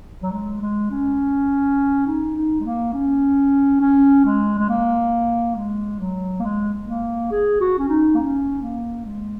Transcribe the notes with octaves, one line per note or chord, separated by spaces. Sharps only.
F#3
G#3
G#3
C#4
D#4
D#4
G#3
A#3
C#4
C#4
G#3
G#3
A#3
G#3
F#3
A#3
G#3
A#3
G#4
F#4
C#4
D#4
A#3
C#4
A#3
G#3